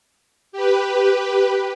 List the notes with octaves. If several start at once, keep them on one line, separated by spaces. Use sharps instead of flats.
G4 B4